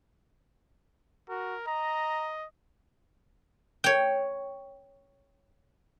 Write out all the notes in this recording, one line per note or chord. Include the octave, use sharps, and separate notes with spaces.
F#4 A#4
D#5 A#5
C#5 G5